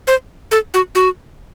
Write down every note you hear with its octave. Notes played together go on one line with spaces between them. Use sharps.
C5
A4
F#4
F#4